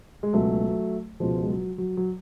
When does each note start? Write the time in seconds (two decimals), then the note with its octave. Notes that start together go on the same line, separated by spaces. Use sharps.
0.23 G#3
0.33 C#2 B2 F#3 A3
1.20 C#2 B2 F3 G#3
1.43 G#3
1.49 F#3
1.78 F#3
1.97 F#3